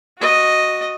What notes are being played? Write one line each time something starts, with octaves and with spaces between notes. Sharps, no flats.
F#4 D#5